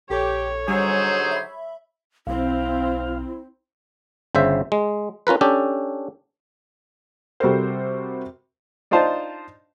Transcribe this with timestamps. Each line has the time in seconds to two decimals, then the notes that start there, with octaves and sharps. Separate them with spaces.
0.10 A#1 G4 A4 C#5
0.68 D3 F#3 G3 D#4 G4 G#4 C5 G#5
1.31 E5 B5
2.27 B1 C4 E4 F5
4.35 G1 C#3 C5 E5
4.72 G#3
5.27 C#4 F4 A#4 B4
5.41 C#4 D4 G4 A4
7.40 C3 G3 F#4 A4 A#4 C5
8.91 D4 D#4 F4 C5 A5